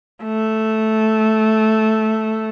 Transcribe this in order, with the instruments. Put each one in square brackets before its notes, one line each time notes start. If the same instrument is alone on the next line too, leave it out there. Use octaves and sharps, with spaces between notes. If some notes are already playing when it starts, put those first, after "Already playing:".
[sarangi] A3